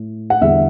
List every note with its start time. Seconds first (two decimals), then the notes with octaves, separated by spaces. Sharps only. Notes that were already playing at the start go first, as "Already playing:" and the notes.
Already playing: A2
0.30 F#5
0.41 E2 D3 G3 E5